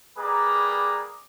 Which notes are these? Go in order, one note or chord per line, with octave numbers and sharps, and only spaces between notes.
G3 A#3 G#4 B4 D5 A#5